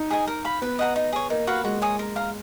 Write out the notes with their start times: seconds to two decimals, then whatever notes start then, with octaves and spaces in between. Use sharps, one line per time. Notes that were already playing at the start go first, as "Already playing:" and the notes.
Already playing: D#4
0.10 G#4 D#5 G#5
0.27 A#4
0.45 F5 B5
0.62 B3 B4
0.79 D#5 F#5 A#5
0.96 D#4
1.13 G#4 C#5
1.30 A#3 D#4
1.47 F#4 B4 F5
1.64 G#3 F#4
1.82 C#5 G#5 D#6
1.99 A#4
2.16 F5 A#5